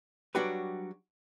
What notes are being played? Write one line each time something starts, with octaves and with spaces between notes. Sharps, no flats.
F#3 G3 D4 F#4 G4 B4